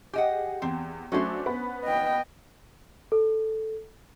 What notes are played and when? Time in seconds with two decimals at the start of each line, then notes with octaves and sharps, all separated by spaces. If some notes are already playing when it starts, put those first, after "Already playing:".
0.13 G4 G#4 D#5 F#5
0.62 E2 C4
1.12 F#3 A3 C#4 D4 C5
1.46 B3 B5
1.84 D#5 G5
3.12 A4